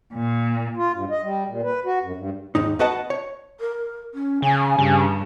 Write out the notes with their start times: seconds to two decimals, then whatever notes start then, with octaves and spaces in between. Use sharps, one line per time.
0.13 A#2
0.75 F4
0.94 G2
1.10 D#5
1.23 G3
1.47 A#2
1.63 B4
1.85 F#4
2.03 F#2
2.16 G2
2.55 D#2 G#2 D#4
2.79 B3 F#4 B4 D#5 F#5 A5
3.10 C#5
3.60 A#4
4.14 C#4
4.42 C#3 G#5
4.79 G2 C#3